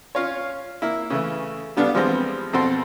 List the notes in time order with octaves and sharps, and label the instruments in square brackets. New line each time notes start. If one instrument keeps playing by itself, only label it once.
[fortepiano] C#4 F4 C#5
A#3 E4
C#3 E3 A3
G3 B3 D4 A4 F5
E3 F3 G3 G#3 B3 C4
F2 B2 C4 A4 C6